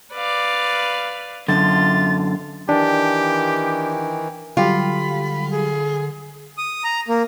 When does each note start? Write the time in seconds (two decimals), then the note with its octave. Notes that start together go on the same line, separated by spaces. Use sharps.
0.13 B4 D5 F5
1.48 F#2 D3 F4 A6
2.69 D#3 E3 D4 G4
4.57 D3 F#3 G3 F4 G4 B5
5.51 G#4
6.58 D#6
6.84 A#5
7.08 A#3